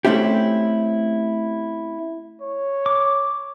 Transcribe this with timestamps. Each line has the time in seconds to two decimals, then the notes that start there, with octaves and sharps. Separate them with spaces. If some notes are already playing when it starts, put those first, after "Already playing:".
0.05 A3 C4 C#4 E4 G4
2.41 C#5
2.86 D6